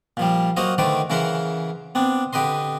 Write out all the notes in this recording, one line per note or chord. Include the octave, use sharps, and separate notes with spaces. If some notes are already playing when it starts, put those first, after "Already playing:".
A#2 F3 G3
F#3 A#3 F#4 C5 D#5 F5
D3 D#3 A3 B4 C5 D5
C#3 E3 A#4 E5 F#5 C6
B3 C4 D4
D3 G4 B4 D#5 C6